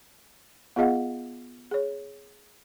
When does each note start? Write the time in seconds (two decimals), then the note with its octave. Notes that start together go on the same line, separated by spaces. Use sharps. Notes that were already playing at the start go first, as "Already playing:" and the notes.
0.76 B3 F4 G#4 D#5 F5 F#5
1.71 G#4 C#5